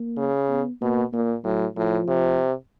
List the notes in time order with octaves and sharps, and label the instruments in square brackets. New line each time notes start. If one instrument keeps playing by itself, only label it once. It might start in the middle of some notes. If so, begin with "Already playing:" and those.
Already playing: [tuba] A#3
[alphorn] C#3
[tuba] B3
[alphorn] B2 [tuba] A#3
[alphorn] A#2 [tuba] A#3
[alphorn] A2 [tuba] F#3
[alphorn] A2 [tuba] F3
[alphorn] C3